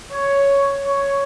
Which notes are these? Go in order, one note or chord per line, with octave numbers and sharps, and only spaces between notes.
C#5
C#5